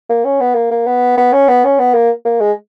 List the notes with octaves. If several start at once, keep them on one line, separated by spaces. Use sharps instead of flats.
A#3
C#4
B3
A#3
A#3
B3
B3
C#4
B3
C#4
B3
A#3
A#3
G#3